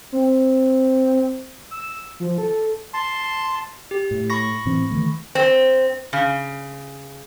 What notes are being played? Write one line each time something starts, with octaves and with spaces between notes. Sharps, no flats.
C4
E6
F3
A4
A5 C6
G4
A2
B5 C#6 A#6
A2 E3 C4
D#3 E3 A3
C4
C#3